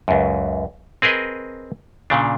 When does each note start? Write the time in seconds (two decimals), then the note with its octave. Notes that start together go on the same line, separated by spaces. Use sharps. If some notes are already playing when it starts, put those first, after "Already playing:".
0.08 C#2 F#2
1.02 C4 G#4 A#4 B4 D#5
2.10 A#2 C#3 D4